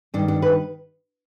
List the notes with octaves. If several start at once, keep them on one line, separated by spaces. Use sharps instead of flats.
G2 D#3 D4
D4
B4